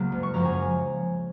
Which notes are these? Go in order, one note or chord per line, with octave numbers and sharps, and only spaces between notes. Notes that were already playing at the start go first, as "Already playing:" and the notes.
Already playing: C#2 C#3 F#3 A#3
F#1
C#6
F#2 F3 A#3 A#5
G#5